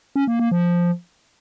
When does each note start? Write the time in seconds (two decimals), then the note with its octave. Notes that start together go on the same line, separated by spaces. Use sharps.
0.16 C#4
0.28 A#3
0.39 A#3
0.51 F3